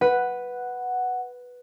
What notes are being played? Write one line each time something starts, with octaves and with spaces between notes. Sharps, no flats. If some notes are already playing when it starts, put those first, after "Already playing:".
B4 F#5